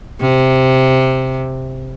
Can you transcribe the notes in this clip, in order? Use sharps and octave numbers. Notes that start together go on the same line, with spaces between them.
C3